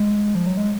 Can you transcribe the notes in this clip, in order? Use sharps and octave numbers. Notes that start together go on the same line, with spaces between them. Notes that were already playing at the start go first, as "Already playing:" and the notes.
Already playing: G#3
F3
F#3
G#3